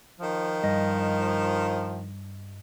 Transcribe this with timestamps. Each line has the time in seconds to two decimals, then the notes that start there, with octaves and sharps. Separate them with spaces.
0.20 D#3 F3
0.64 G2 D#5